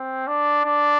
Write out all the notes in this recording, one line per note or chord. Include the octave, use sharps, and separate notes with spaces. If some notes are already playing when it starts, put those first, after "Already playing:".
Already playing: C4
D4
D4